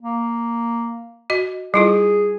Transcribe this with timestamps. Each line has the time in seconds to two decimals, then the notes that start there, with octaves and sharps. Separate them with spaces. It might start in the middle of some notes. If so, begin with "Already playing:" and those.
0.02 A#3
1.30 F#4 D#5
1.74 G3 E4 F4 G#4